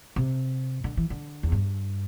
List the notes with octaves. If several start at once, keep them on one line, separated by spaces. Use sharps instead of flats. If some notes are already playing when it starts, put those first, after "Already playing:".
C3
D3
E3
D3
E2
G2